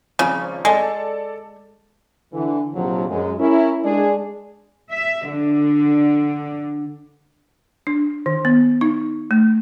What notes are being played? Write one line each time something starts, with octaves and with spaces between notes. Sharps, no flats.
G#1 C#3 F3 C#4
G#3 A4 D5 A5
D3 E3
A#1 F2 G#2 C3 F3 F#3
F#2 G#3
C#4 E4 A#4
G#3 D4 G#4
E5
D3
D4
D#3
B3
D#4
A3